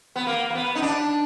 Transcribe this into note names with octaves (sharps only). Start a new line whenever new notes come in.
B3
A#3
A#3
B3
D#4
D4